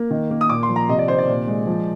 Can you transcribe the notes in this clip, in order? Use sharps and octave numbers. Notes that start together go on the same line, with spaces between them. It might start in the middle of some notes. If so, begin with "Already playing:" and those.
Already playing: A#3
D#3
A#3
D#6
A#2 D6
C6
F3
A#5
C3 D#5
D5
D#3 C5
D5
A#2
G#3
F3